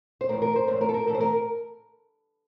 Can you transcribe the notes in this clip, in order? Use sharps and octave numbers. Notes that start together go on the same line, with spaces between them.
C5
A2 E3 A#4
A#4
C5
A2 E3 C5
A#4
A4
A#4
A2 E3 A4
C5
A#4